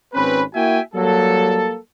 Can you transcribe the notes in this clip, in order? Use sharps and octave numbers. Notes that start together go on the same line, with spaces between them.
G#1 C4 C#4 B4
A#3 E4 F#4 E5 G5 G#5
F#3 G3 A#3 A4